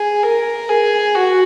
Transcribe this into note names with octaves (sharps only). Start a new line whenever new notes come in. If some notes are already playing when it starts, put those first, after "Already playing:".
Already playing: G#4
A#4
G#4
F#4